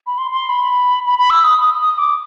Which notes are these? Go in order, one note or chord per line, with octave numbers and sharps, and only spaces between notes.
B5
C6
C6
B5
B5
B5
E6
D#6
D#6
D#6
D6